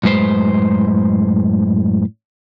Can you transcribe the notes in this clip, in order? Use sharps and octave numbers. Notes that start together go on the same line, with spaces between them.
F#2 A2 G#3 B4 C5